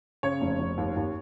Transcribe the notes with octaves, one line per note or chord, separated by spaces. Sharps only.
C#3 C#5
F1
F1
D#2
D#2